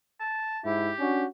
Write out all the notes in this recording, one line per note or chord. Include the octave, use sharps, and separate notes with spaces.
A5
G#2 E4 G4
C#4 D4 F#4